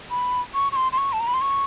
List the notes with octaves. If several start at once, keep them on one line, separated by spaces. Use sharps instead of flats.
B5
C#6
C#6
C6
C6
C#6
A5
A#5
B5
C6
C#6